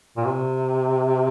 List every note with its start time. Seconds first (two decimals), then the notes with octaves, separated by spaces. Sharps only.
0.17 A#2
0.25 C3